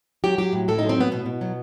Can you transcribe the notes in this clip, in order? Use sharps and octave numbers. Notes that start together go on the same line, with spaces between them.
F#3 G4
F#3 G4
A2
A2 A4
F#3 D#4
C4
A2 B3
B2 B3
B2
F#3